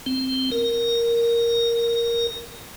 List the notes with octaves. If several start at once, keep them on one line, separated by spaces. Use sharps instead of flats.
C4
A#4